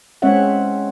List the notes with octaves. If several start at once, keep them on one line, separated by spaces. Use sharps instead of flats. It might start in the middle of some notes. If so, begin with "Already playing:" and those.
G#3 C4 C#4 C#5 E5 F#5